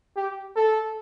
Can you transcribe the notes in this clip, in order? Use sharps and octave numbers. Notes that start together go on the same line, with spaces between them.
G4
A4